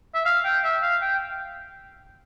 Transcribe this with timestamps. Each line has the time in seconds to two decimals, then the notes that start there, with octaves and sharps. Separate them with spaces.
0.14 E5
0.25 F5
0.45 G5
0.63 E5
0.82 F5
1.02 G5